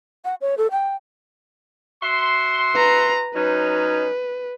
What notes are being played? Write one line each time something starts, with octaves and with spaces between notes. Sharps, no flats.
F#5
C#5
A4
G5
F#4 E5 C6
B4 A#5
F#3 C#4 D#4 B4